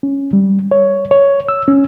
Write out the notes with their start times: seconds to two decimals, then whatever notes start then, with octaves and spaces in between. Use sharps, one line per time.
0.03 C#4
0.33 G3
0.71 C#5
1.11 C#5
1.48 E6
1.68 C#4